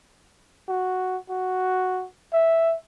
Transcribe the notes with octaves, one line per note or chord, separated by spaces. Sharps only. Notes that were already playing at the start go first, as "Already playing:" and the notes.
F#4
F#4
E5